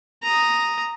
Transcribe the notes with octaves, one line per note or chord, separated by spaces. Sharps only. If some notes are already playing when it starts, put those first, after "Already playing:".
A#5 D#6